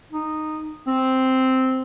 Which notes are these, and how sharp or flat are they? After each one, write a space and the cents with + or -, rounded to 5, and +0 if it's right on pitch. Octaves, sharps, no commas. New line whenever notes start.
D#4 -10
C4 -5